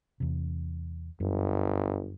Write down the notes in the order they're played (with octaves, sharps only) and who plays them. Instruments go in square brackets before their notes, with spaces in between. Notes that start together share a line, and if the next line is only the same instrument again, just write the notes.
[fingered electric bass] E2 C3
[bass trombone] G1 [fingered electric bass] F#2